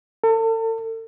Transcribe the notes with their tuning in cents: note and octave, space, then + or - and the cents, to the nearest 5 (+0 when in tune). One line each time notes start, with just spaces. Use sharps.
A4 +35